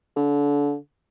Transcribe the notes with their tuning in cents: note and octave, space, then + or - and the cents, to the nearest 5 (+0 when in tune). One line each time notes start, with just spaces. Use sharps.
D3 -30